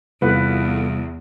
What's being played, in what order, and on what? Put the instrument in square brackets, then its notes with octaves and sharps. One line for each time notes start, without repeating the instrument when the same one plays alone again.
[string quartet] E2 [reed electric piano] C3 G3 E4 [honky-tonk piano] A3 B3 F4 [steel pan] B4